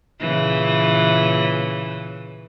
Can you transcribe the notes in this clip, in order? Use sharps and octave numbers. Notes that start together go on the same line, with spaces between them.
A#2 C#3 E3